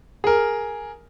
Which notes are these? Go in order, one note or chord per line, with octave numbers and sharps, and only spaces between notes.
G#4 A#4